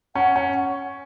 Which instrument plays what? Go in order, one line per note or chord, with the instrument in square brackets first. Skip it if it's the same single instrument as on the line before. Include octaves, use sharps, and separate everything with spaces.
[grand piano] C#4 [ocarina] F#5
[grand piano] C#4